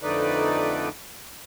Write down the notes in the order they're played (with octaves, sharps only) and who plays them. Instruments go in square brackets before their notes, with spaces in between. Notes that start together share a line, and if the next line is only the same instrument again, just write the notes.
[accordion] F2 D3 A3 D#4 B4 D5